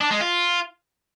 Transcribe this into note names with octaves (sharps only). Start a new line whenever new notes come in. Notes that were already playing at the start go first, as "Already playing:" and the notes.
D4
G#3
F4